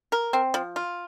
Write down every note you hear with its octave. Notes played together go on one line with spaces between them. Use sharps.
A#4
C4
F3
F4